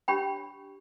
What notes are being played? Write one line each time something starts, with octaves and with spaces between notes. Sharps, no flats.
D4 G4 C#5 G5 B5